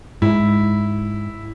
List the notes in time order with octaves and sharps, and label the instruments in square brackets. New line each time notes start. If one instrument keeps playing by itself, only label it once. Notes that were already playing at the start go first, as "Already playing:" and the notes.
[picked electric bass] G#2 [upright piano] E4